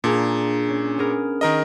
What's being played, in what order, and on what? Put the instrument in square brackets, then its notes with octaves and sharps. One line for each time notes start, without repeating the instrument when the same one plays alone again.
[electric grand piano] A#2 [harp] D4 G#4 A#5
[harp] C#4
B3 G#4 A#4
[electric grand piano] D#3 A#4 D#5